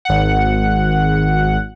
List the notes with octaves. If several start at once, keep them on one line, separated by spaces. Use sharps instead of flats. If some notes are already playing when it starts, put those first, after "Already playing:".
G#1 F#5